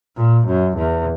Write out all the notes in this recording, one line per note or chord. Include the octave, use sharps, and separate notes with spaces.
A#2
F#2
E2